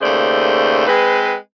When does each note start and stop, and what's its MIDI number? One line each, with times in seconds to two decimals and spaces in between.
0.01 0.84 39
0.01 0.84 49
0.01 0.84 57
0.01 0.84 72
0.01 0.84 74
0.87 1.33 56
0.87 1.33 60
0.87 1.33 71